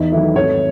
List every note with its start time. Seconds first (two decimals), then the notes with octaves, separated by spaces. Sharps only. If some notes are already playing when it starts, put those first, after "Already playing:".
Already playing: E2 D#4
0.12 D#3 F#3 A3 E4
0.35 G#1 A4 C#5